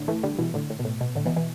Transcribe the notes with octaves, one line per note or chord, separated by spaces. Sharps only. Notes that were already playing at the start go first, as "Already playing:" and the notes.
Already playing: A2 D3
E3 A3
D3 G3
B2 E3
A2 D3
A2
B2
A2
B2
A2 D3
B2 E3
B2 E3